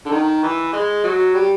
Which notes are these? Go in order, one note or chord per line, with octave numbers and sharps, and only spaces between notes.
D3
D#3
E3
G#3
F#3
G3